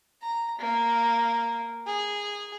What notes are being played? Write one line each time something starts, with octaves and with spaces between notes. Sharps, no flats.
A#5
A#3
G#4